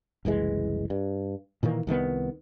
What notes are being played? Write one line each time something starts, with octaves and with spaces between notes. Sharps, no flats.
F#1 C2 E3 G#3
G2
A#2 D#3 E3 A#3
C2 D#3 G#3 B3